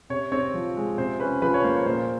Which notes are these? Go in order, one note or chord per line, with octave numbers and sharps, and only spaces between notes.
C3 C#5
C4 C#5
F3
G#3
C3 C5
C#4 B4
F3 B4
C#5
A#3 C5
C#5
A#2 C5